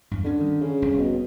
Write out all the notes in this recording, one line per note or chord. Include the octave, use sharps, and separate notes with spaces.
E2 G2
D3 G3 C#4
D#3
C#3
F1 C2
B2